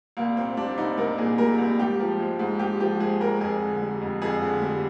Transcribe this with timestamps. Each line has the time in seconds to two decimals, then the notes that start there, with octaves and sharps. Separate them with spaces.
0.17 C2 A#3
0.37 A#2 C4
0.57 G3 D4
0.78 C2 D#4
0.97 C2 A#4
1.18 A#2 G#4
1.38 G3 A#4
1.58 C2
1.79 G#2 G4
1.99 F3
2.19 G#3
2.39 G#2
2.59 G#2 G4
2.80 F3 G4
3.00 G#3 G#4
3.21 G#2 A#4
3.40 F2 G#4
3.61 D3
3.82 G3
4.01 F2
4.22 F2 G#4
4.42 D3
4.62 G3